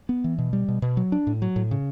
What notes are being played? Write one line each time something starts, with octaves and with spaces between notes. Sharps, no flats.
B3
E3
B2
G3
B2
B2
F#3
D4
A2
F#3
A2
C#3